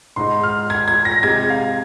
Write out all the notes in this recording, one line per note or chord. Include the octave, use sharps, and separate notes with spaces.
G#2 G#3 D#4 C6
F6
G#6
G#6
A#6
C3 G#3 D#4 G#6
F5